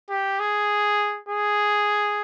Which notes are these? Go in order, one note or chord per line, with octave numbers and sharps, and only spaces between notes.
G4
G#4
G#4